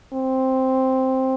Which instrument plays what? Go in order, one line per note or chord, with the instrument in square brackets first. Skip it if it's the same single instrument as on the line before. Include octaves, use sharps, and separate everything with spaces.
[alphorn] C4